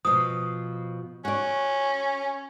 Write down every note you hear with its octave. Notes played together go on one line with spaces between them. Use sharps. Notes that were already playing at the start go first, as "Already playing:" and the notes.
B2 F3 D#6
C#4 F#4 D5